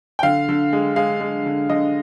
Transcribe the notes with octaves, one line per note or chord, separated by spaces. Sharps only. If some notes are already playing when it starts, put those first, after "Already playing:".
G5
D3 F5
D3
G#3
G#3 F5
G#3
D3
D3 D#5